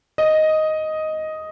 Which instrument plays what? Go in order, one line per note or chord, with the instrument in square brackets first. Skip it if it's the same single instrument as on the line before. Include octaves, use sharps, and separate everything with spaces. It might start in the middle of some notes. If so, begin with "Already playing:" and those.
[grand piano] D#5